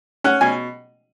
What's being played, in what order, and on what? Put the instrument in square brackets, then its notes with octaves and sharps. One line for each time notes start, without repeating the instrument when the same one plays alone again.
[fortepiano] C#4 F#5
B2 G#5